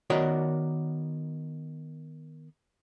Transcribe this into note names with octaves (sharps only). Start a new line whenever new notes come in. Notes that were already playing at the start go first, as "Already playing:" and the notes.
D#3 B3 F#4 A#4 C#5 D5